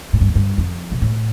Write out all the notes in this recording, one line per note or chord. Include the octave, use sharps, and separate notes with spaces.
A2
G2
F2
G2
F2
B2
A2